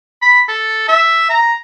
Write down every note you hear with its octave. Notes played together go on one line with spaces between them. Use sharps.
B5
A4
E5
A#5